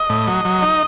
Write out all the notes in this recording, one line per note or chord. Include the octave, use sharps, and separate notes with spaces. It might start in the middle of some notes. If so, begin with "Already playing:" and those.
Already playing: D#5
A2
F#3
F#3
D#4